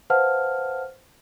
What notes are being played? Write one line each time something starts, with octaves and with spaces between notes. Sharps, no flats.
B4 C5 F5 F#5 A5 F6